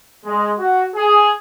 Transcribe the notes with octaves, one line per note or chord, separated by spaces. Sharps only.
G#3
F#4
G#4